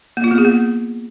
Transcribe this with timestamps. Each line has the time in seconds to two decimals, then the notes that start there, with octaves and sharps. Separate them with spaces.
0.17 A#3
0.24 F4
0.31 B3
0.38 G#4
0.45 A#3